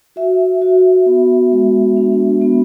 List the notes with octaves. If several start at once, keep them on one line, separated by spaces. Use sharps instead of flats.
F#4 E5
F#4
B3
G#3
D4
B3